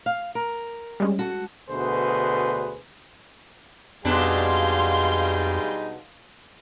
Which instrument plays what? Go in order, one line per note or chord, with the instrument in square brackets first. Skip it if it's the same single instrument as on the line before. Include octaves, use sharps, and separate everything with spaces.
[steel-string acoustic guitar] F5
A#4
[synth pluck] G3 G#3 C#4
[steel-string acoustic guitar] F#4 A4
[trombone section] D2 B2 D3 G#4 B4 C5
[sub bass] F2 [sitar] B2 D4 [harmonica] G3 D#4 G#4 [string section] F5 C6